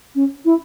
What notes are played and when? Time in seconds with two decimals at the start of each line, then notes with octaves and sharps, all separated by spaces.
0.15 C#4
0.45 E4